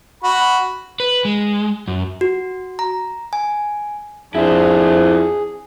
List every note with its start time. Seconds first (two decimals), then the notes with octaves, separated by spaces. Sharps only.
0.23 F#4 B5
1.00 B4
1.25 G#3
1.88 F#2
2.21 F#4
2.79 A#5
3.33 G#5
4.35 F2 D4 E4 G#4 C5